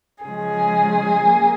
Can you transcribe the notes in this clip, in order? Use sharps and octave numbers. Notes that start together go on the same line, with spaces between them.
C#3 F3 G#3 G#4
A#3